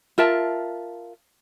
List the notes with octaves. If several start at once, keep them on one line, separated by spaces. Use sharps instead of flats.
F4 A#4 E5 A5